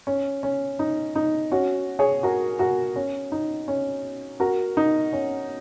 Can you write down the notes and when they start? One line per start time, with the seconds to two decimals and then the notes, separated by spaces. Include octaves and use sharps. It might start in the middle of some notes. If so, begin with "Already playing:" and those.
0.07 C#4
0.43 C#4
0.79 D#4
1.15 D#4
1.52 C#4 F#4
1.99 G#4 C#5
2.23 F#4 A#4
2.59 F#4 A#4
2.96 C#4
3.32 D#4
3.68 C#4
4.40 F#4 A#4
4.77 D#4
5.13 C#4